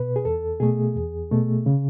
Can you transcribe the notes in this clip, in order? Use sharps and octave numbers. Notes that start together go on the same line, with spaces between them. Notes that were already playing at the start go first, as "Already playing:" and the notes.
Already playing: B2 B4
G#4
E2 A4
B2 A3 G#4
E2
B2 A3
C#3